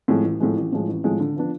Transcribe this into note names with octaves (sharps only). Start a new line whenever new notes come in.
A2 F3 G#3
A1
A2 F3 G#3
A1
A2 F3 G#3
A1
A2 F3 G#3
D3
F3 B3 D4